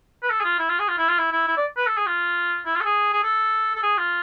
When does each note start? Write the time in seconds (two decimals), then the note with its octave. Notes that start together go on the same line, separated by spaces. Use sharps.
0.23 B4
0.30 A4
0.40 G#4
0.44 F4
0.59 E4
0.69 F4
0.79 G#4
0.88 F4
0.98 E4
1.08 F4
1.18 E4
1.32 E4
1.48 E4
1.57 D5
1.77 B4
1.86 A4
1.97 G#4
2.06 F4
2.66 E4
2.75 F4
2.81 A4
2.85 G#4
3.13 G#4
3.23 A4
3.75 A4
3.83 G#4
3.98 F4